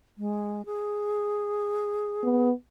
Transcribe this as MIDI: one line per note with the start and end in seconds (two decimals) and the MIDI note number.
0.18 0.65 56
0.66 2.48 68
2.23 2.52 59